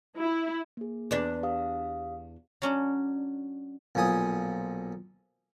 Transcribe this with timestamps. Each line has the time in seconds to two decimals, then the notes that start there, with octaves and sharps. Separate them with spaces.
0.18 E4
0.77 A#3 G#4
1.11 E2 D4 B4
1.43 G4 F5 D#6
2.62 F#3 C#4 D4
3.95 B1 A#2 F3 G#5 D#6